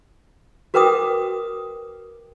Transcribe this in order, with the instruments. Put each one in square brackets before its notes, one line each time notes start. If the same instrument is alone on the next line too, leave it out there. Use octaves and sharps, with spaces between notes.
[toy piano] F#4 A#4 B4 G5 D6 D#6